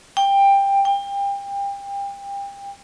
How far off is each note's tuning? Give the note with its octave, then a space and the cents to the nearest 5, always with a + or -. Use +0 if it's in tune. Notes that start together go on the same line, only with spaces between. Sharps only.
G5 +15
G5 +30